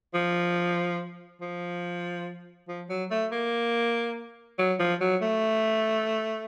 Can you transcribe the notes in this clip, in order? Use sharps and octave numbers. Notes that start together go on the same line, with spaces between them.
F3
F3
F3
F#3
A3
A#3
F#3
F3
F#3
A3